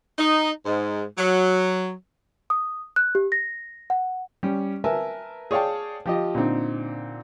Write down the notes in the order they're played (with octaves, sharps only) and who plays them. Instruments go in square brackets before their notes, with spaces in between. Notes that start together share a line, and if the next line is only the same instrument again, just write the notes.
[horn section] D#4
G#2
F#3
[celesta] D#6
F#6
G4
A#6
F#5
[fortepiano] G3 C#4
A#4 B4 E5 G#5 A5
G#4 C#5 D5 F5 G5 A5
F3 G4 D#5
A#2 D3 C4 D#4